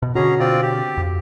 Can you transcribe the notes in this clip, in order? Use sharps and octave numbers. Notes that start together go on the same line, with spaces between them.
B2
B2 D3 C#4 F#4 G#4 A#5
C4 F4 D5
G4
F2